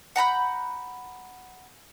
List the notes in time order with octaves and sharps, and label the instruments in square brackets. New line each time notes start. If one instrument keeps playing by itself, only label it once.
[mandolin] F#5 A#5 B5 G6